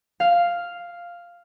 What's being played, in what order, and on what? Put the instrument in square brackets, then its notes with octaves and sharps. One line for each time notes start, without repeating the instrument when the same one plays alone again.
[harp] F5